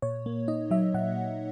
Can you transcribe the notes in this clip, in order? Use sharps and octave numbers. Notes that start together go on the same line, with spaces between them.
A#2 C#5
A#3
D#4 D#5
F#3 E5
A#2 F#5